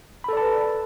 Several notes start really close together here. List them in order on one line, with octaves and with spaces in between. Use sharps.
B5 A4 D5 A5 B4